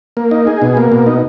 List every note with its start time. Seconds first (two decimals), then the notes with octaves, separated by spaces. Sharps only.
0.17 A#3
0.31 D#4
0.47 G#4
0.62 B2
0.77 A#3
0.92 B2
1.06 D#4